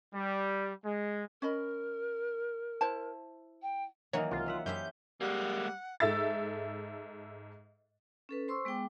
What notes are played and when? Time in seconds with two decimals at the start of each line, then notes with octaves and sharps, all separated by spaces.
0.14 G3
0.84 G#3
1.42 C#4 A#4 D#5 B5
2.81 E4 C5 A5
3.62 G5
4.13 D#3 E3 F#3 A#3 D#4 C#5
4.31 C2 F4
4.46 C#4 E5 F#5
4.66 F#2 C#4 E4 G4 C5 E5 G6
5.21 G3 G#3 A#3 F#5
6.00 G#2 A4 E5 E6 A6
8.29 C#4 A4 B4
8.48 C5 C6 C#6 E6
8.65 G#3 B3 G#4 G5 D6